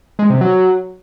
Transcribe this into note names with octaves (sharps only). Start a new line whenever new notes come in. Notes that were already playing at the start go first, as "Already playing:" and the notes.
G#3
C3
F#3